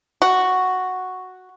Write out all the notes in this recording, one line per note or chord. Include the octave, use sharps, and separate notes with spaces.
F#4